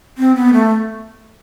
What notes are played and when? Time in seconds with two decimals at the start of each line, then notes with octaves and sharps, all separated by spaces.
0.18 C4
0.35 B3
0.53 A3